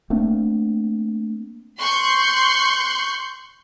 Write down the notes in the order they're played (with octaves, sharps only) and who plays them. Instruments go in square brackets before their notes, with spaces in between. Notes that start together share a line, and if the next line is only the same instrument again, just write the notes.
[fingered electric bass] A3 A#3 C4 D4
[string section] C6 C#6 F#6 G6